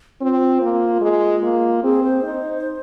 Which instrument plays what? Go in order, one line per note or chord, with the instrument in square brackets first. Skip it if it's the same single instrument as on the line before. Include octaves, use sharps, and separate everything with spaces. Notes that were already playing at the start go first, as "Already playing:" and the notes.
[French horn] C4 [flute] F4
[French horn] A#3
G#3
A#3
[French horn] C4 [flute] G#4
[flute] C5
[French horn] D#4